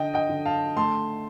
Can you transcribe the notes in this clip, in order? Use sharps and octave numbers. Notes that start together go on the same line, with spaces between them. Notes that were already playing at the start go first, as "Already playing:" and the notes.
Already playing: D3 D#5 G5
D#5 G5
D3
F5 A5
A3 A5 C6